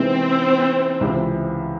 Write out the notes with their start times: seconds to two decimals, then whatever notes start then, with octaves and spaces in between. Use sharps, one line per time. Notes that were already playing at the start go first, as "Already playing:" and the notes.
Already playing: C3 E3 G#3 B3 C4 D#4
1.01 C#2 C3 E3